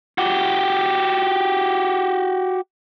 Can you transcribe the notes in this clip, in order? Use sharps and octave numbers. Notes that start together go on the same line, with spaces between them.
F#4 G4